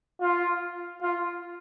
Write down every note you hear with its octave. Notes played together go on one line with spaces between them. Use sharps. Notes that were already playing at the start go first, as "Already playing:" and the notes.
F4
F4